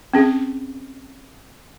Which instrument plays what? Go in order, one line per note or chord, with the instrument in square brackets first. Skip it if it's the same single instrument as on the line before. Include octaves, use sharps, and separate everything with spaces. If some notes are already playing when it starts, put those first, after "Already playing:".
[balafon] C4 C#4 G#4